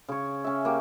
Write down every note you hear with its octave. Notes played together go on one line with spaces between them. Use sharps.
C#3 C#5
C#4 E5
A#3 G4